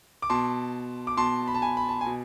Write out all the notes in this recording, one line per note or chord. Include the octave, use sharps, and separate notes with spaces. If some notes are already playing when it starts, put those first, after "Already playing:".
D6
B2 A5 C6
D6
B2 A5 C6
B5
A5
G#5 B5
B5
A5
G#5
B2